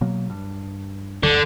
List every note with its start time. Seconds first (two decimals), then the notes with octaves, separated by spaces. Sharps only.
0.01 B2 F#3 A#3
0.30 G2
1.23 F#1 D2 G2 D3